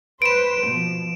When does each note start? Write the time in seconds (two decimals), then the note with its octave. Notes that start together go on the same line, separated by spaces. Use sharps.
0.22 B4 C5 D7 E7
0.67 B2 F3